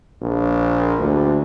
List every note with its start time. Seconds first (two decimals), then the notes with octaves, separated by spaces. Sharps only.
0.22 A#1
0.99 D2